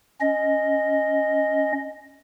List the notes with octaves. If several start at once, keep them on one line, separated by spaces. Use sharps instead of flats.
C#4 D#5